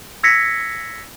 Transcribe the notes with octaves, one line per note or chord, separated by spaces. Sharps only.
E6 G#6 A#6 B6 C#7